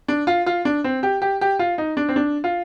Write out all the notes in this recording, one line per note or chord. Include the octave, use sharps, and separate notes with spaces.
D4
F4
F4
D4
C4
G4
G4
G4
F4
D#4
D4
C4
D4
F4